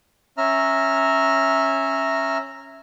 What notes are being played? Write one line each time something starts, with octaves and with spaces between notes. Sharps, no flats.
C#4 E5 A#5 F6